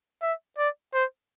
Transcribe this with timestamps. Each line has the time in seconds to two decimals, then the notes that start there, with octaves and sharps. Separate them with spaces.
0.22 E5
0.58 D5
0.94 C5